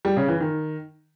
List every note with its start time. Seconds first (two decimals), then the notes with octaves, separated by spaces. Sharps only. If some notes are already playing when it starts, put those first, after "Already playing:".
0.05 G3
0.17 C#3
0.28 E3
0.40 D#3